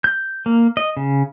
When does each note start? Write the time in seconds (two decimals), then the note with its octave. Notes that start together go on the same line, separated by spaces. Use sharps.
0.04 G6
0.46 A#3
0.77 D#5
0.97 C#3